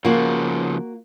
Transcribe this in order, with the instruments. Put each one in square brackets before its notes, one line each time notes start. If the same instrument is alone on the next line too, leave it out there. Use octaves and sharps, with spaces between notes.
[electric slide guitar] C#3 F3 [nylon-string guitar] A#3 F#4